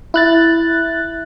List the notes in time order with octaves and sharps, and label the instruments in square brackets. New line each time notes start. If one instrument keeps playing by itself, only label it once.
[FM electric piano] E4 F#6 A6